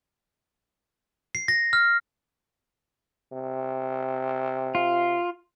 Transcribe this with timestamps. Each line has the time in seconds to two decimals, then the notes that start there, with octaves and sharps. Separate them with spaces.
1.35 C7
1.48 A#6
1.73 F6
3.33 C3
4.75 F4